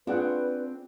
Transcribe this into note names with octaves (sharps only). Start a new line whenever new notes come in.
C4 D4 F4 G#4 B4 F#5